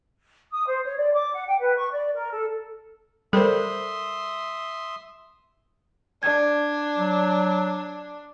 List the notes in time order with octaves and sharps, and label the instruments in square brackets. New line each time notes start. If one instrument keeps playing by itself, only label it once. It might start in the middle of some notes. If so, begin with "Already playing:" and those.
[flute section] D#6
C5
C#5
D5
D6
F#5
G5
B4
C#6
D5
A#4
A4
[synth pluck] G3 C5 [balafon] A4 A#4 [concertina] E5 C6 D#6
[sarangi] D4 [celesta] D5 G#6
[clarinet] F#3